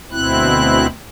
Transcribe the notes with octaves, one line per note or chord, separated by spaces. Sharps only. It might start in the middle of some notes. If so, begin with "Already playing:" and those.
D2 B2 C4 E4 F#6